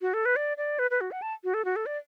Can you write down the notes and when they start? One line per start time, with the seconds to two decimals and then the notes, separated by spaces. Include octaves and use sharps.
0.02 F#4
0.14 A4
0.25 B4
0.36 D5
0.57 D5
0.79 B4
0.91 B4
1.01 F#4
1.11 F#5
1.22 A5
1.44 F#4
1.54 A4
1.65 F#4
1.76 A4
1.86 D5